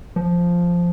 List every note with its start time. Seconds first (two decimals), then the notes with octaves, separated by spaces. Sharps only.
0.16 F3